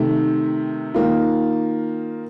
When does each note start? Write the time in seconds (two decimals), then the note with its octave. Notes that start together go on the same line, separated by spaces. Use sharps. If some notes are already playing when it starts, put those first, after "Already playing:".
Already playing: C3 D#3 A3
0.94 D#3 A#3 F4